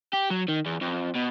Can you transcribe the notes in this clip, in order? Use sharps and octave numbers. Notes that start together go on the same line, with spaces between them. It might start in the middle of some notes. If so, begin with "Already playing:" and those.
G4
F#3
D#3
E2
F2
B2